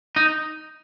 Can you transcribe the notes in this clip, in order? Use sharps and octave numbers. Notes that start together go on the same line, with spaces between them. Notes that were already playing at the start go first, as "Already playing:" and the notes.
D#4